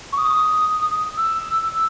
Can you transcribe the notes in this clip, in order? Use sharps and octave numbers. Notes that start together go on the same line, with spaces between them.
C#6
D#6
E6